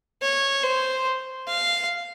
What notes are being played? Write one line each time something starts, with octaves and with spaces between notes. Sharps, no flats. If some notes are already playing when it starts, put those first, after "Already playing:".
C#5
C5
F5